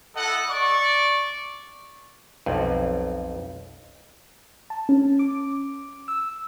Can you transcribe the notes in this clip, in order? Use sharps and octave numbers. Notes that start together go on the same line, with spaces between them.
E4 A4 D#5 F#5
D5 C#6
B1 F2
A5
C#4
D6
E6